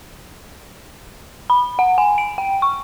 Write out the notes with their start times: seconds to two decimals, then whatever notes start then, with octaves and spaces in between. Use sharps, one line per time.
1.50 B5
1.79 F#5
1.98 G#5
2.18 D7
2.38 G5
2.62 C#6